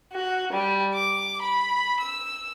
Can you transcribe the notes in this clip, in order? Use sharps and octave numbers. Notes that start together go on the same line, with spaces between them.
F#4
G3
D6
B5
E6